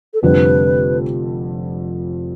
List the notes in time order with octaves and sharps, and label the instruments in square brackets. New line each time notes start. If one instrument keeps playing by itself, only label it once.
[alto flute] A4
[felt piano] F1 F2 D3 G3 C4 [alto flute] B4